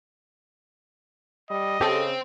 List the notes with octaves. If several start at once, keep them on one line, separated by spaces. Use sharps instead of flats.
G3 D#5
C#3 C4 G4 A4